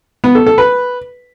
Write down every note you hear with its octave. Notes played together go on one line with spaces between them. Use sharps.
B3
A4
A4
B4